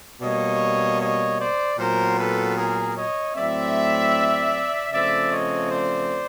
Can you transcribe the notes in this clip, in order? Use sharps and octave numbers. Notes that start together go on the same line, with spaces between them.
B2 G3 A#3 C#5 D#5
C#5 D#5
C5 D5
A#2 F#3 B3 A#4 C5
A4 B4
G#4 A#4
C#5 D#5
A2 F#3 A3 C4 D5 E5
C#3 F3 A3 C4 D5 E5
C#5 D#5
C5 D5